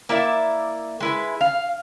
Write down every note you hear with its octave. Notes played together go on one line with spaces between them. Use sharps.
A#3 E4 D5 E5
G#3 E4 B4
F5